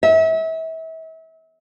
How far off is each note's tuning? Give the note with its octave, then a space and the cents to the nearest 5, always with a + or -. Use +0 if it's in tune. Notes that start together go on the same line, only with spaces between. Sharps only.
E5 -35